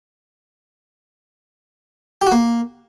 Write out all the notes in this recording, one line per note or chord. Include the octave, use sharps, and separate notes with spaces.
G4
F#4
A#3